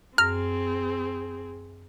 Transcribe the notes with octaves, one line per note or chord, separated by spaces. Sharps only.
F#2 C4 G#4 F6 A#6